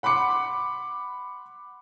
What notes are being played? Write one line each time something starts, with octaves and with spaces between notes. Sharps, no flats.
F#5 B5 C6 D6 C#7